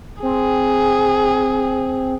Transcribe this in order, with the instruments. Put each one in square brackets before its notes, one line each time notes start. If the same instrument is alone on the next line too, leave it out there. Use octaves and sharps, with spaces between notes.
[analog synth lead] C4 [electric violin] G#4